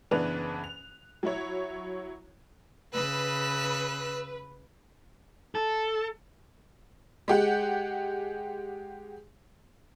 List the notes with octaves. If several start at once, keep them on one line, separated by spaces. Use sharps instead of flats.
F#1 E3 B3 D4 B4 F#6
F7
F#3 E4 C#5
C#3 B4 E6 F#6
A4
G#3 G4 F#5